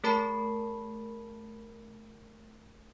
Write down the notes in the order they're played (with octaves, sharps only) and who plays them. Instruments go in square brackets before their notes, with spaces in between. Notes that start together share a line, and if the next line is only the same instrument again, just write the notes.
[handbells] A3 G#4 A#4 A5 B5 C7